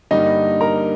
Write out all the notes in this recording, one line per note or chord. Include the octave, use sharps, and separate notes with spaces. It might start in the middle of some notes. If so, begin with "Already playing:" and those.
G2 D3 G3 A#3 D#4 D#5
A#4 A#5